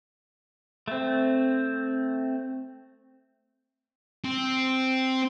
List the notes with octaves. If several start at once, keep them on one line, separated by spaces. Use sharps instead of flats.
A3 C4
C4